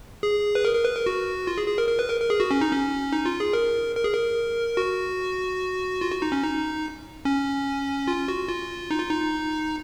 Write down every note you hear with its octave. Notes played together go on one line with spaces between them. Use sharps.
G#4
B4
A#4
A#4
B4
A#4
F#4
F4
G#4
G#4
A#4
A#4
B4
A#4
A#4
G#4
F#4
C#4
D#4
C#4
D#4
F4
G#4
A#4
A#4
G#4
A#4
F#4
F4
F#4
D#4
C#4
D#4
C#4
F4
F#4
F4
D#4
F4
D#4